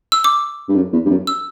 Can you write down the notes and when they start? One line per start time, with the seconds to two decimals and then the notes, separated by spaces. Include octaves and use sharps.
0.12 E6
0.24 D6
0.69 G2
0.76 F#2
0.93 E2
1.05 G2
1.10 F#2
1.27 E6